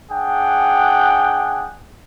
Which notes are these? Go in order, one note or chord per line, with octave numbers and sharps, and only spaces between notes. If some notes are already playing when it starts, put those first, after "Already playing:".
D4 G#4 F#5 G5